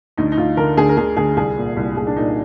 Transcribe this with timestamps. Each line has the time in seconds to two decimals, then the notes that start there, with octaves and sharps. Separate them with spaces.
0.17 D2 D#4
0.32 D#4
0.38 D2 F4
0.57 D3 A#4
0.77 D2 G#4
0.89 A#4
0.97 D2 G#4
1.17 D2 G#4
1.37 C2 G#4
1.57 A#2
1.76 C2
1.97 C2 G#4
2.07 D4
2.16 A#2 D#4